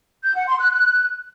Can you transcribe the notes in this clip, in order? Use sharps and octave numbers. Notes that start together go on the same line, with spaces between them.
G6
F#5
C6
F#6
F#6